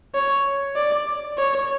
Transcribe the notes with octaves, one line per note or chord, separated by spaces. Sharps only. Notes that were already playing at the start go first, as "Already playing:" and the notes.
C#5
D5
C#5